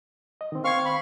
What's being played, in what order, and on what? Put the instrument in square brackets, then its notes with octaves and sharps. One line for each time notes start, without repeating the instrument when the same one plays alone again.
[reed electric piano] D#5
D#3 C4
[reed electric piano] C4 G#6 [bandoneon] F5 C#6 F6
[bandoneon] B5